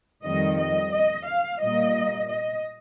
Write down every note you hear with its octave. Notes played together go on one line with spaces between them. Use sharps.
F2 D#3 G3 D#5
D#5
D#5
F5
A#2 G3 A#3 D#5
D#5